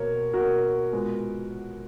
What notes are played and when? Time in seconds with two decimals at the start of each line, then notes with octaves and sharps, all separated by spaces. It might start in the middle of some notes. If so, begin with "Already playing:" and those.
Already playing: B2 A#3 A#4 C#5
0.33 B2 A#3 F#4 A#4
0.92 A#2 G#3 B3